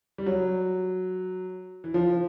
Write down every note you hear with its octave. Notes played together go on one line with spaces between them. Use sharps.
G3
F#3
E3
F3